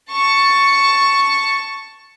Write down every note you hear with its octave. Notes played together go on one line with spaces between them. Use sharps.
A5 C#6